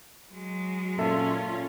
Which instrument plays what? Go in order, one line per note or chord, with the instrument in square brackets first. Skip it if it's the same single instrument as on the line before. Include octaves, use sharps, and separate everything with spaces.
[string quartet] F#3 G#3
[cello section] A#2 C#4 F4 [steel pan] A#3 A4 E5